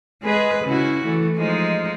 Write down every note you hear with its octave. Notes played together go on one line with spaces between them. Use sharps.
G#3 G#4 B4
C#3 E4 F#4
E3 A3
F3 G#3 D#4